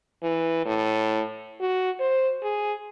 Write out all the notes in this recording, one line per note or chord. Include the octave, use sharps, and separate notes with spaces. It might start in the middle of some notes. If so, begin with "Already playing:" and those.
E3
A2
F#4
C5
G#4